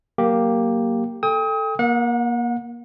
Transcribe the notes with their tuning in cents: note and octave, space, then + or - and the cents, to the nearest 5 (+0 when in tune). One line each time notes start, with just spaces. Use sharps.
F#3 +0 A#3 +0 G4 +0
A4 +0 G5 +35 D#6 +35
A#3 +25 F#5 -35